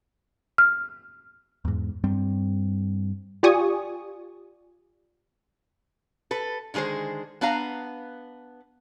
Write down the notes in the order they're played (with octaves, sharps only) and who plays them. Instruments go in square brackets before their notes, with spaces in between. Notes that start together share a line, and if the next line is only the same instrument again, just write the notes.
[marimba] F6
[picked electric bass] E2 G#2
G2 G3 C4
[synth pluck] F4 G4 D5 G#5 C#6 D#6
[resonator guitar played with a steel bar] A4 B4
D3 D#3 G#3 G#4 C5
B3 D4 B4 F5 A#5